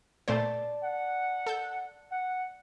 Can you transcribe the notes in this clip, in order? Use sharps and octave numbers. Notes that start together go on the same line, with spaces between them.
A#2 A3 C5 D5 A5
F#5
A4 G6
F#5